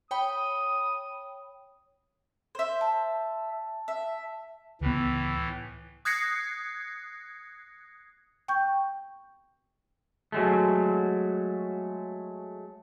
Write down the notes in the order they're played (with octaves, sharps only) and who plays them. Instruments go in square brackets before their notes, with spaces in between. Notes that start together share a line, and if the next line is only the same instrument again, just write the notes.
[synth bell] C#5 G5 B5 [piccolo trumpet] D#6
[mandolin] C5 E5
[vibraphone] A5
[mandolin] E5
[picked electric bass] C#2 B3 [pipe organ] A2 E3
[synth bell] D#6 F#6 G#6 A#6 C7 C#7
[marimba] G5 C#6 G6
[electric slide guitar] F#3 G#3 A3